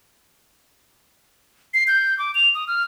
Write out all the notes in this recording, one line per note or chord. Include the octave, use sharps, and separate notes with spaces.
C7
G6
D6
F7
D#6
F6